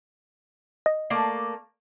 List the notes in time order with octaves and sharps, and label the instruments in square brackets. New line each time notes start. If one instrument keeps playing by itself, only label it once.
[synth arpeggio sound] D#5
[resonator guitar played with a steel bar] A3 A#3 D5 [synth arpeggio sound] C7